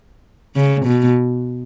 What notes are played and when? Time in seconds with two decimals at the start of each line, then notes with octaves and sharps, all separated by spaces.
0.56 C#3
0.85 B2